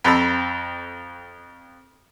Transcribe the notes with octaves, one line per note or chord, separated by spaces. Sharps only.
F2 C4 A4 A#5 B5 E6